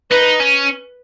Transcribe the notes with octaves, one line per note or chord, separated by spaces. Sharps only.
D#4 B4
C#4